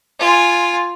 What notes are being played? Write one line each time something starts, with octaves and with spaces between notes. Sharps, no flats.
F4 G#5